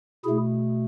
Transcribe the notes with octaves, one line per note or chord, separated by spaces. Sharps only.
B2 A3 E4 G#4